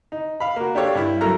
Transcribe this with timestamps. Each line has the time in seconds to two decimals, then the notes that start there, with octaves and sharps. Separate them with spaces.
0.12 D#4
0.40 F5 B5
0.56 A#3 F#4
0.75 D4 G4 A4 C#5 D5 F5
0.95 G2 E4
1.21 F#3 A3 A4 A#4 A#5 F6